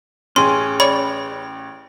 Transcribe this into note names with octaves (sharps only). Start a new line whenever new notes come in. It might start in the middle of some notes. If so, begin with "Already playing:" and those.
A1 C#4 G#4 C6
C#5 D5 B5